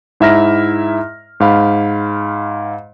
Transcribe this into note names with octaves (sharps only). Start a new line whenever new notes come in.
G#2 E4 E5 A#5 F6 A#6
G#2 F5 B5